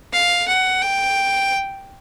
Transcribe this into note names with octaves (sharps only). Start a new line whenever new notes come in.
F5
F#5
G5